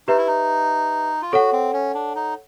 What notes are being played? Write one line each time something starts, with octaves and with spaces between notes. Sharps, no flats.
D#4 G4 B4 E5
E4
D#4
F4
F#4 A4 C#5 F#5
C4
C#4
D4
D#4